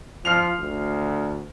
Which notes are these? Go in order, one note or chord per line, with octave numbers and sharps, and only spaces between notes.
F3 F6 C7 F7
D2